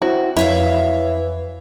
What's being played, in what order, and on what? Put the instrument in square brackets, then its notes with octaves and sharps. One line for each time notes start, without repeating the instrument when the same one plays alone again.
[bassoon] C4 [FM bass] E4 [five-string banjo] F#4
[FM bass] F2 [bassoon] E3 [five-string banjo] E4 [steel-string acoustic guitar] C#5 E5 F5